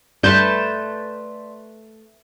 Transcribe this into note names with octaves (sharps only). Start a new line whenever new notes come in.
G2 A3 B4 D5 A5 C6 G6 E7